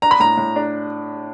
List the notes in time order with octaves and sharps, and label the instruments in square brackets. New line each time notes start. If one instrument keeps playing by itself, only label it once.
[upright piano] D4 [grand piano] A#5
[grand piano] B5
[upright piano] A2 [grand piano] A#5
[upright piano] A2
D4